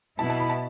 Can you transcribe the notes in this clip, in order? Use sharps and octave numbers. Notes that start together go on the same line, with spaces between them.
B2 B3 E4 A5
A5
B5
A5